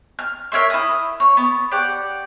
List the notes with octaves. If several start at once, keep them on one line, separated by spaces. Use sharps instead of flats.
F6
A#4 C#5 E5 C6
E4 D#6
C#5
B3
G4 D5 F#5